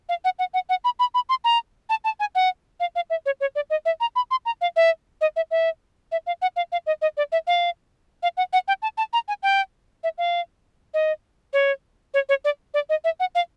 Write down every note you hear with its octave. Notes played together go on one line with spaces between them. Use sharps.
F5
F#5
F#5
F#5
F#5
B5
B5
B5
C6
A#5
A5
A5
G#5
F#5
F5
F5
E5
C#5
C#5
D5
D#5
E5
A#5
B5
C6
A#5
F5
E5
D#5
E5
E5
E5
F5
F#5
F5
F5
D#5
D#5
D5
E5
F5
F5
F#5
F#5
G5
A5
A5
A#5
G#5
G5
E5
F5
D#5
C#5
C#5
C#5
D5
D5
D#5
E5
F#5
F5